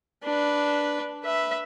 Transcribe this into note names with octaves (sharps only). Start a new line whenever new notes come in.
D4 B4
B4 E5